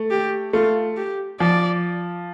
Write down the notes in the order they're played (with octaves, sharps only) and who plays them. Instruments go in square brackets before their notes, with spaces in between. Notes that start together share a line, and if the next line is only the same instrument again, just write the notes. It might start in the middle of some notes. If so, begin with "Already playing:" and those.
Already playing: [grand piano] A3
[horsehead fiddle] G4
[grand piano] A3 [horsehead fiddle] F4
[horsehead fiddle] G4
[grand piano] F3 [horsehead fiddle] D5